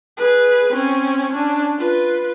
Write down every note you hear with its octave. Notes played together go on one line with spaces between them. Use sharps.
G#4 B4
C4 C#4
C#4 D4
F4 B4